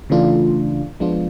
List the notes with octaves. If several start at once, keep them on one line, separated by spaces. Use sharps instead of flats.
C#3 E3 A3 D4 F4
F3 G#3 B3 D4 F4